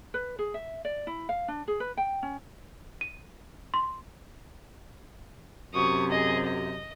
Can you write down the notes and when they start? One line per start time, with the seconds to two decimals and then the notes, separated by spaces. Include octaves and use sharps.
0.14 B4
0.39 G#4
0.54 E5
0.85 D5
1.07 E4
1.29 F5
1.48 D4
1.68 G#4
1.80 B4
1.97 G5
2.23 C#4
3.01 D#7
3.74 C6
5.74 F#2 C3 C#6 D#6
6.11 G#4 D#5
6.45 D#5